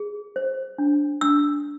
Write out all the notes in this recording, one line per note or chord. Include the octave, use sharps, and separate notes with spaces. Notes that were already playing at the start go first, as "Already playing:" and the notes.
Already playing: G#4
C5
D4
D4 E6